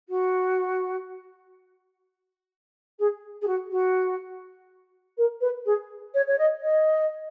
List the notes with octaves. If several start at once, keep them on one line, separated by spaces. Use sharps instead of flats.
F#4
G#4
G#4
F#4
F#4
A#4
B4
G#4
C#5
C#5
D#5
D#5